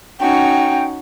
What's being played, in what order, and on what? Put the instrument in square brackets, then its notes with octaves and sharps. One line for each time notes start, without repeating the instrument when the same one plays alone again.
[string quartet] C#4 D#4 F#4 [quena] G5